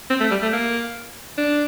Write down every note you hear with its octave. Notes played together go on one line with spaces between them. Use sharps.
C4
A3
G3
A3
A#3
D4